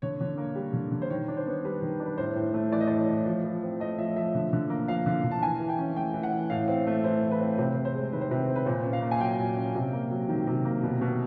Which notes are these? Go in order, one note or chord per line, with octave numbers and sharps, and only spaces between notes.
D3 C#5
D3
A#3
G3
D3
D3
C5
D#3 C#5
D4
C5
B3
G3 B4
D#3
D4
B4
A2 C5
A2
A3
E3 D5
D#5
A2 D5
A2
F3
F3
C4
A3 D#5
F3 E5
F3 E5
D3
D3
A#3
F3 F5
D3
D3
A5
E3 G#5
E3
G5
C#4
A3 G5
E3
F#5
E3
A2 F5
C4
A3
E3 C5
A2
B4
C4
C3 C5
C4
C5
G#3
D#3 B4
C5
C3 B4
C4
B4
A#2 C5
C#4
F5
A#3
G#5
F#3 G5
A#2
C#4
C3
A#3
F#3
D#3
C3
A#3
B2
B2